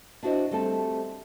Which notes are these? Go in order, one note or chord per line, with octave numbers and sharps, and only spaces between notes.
D4 E4 F#4 G#4 C5 D#5
G3 A3 C4 A4 A5